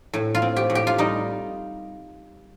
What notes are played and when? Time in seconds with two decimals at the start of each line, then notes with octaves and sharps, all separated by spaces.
0.14 A2
0.35 F4
0.42 C4
0.56 G4
0.70 A2
0.75 G4
0.87 F4
0.98 G3 D#4